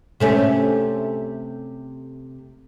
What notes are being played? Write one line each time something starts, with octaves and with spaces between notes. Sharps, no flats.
C3 A3 C#4